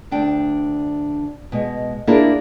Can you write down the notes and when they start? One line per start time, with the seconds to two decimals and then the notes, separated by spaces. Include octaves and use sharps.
0.11 D2 D4 G5
1.52 B2 G#3
2.07 A#3 D4 E4 G#4 A#4